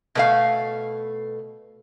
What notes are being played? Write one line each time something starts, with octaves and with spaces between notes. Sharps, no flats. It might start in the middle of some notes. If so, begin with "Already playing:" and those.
B2 A3 F5